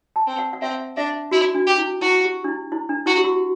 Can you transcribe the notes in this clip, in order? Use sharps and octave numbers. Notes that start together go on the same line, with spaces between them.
A5
C4
F#5
F#5
C4 E5
D4 E5
E4 F#4
D4
G4
E4
E4 F#4
G4
D4
E4
E4
D4
E4 F#4
G4
F#4